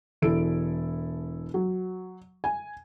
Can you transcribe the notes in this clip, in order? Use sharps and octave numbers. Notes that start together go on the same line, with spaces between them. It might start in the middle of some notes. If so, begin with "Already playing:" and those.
E1 E4 A4 D7
F#3
G#5